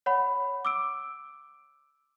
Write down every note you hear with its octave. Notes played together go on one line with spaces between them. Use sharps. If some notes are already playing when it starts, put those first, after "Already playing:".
C#5 F#5 B5
D6 E6 D7